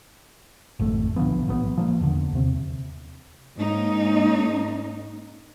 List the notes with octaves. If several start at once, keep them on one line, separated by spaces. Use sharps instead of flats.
G#1 F2 A3
B1 D3 F3 B3
A1 F#3 B3
F3 F#3 A#3
E2 D3
D#2 C3
G#2 A#3 C#4 D#4